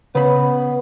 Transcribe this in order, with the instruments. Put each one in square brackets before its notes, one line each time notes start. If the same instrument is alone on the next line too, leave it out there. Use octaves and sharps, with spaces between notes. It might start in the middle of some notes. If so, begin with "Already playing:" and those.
[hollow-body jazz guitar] C#3 B5 [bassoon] B3